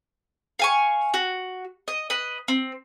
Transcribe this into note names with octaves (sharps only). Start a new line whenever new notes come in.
F5 G#5 C#6
F#4
D#5
B4 D#5
C4